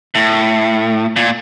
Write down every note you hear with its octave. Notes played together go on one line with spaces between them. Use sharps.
A2
A#2